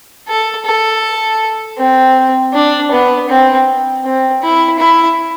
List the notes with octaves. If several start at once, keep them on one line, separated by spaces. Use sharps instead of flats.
A4
A4
C4
D4
B3
C4
C4
E4
E4